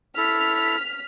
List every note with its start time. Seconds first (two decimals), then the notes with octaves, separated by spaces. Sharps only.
0.17 E4 A4 F6 B6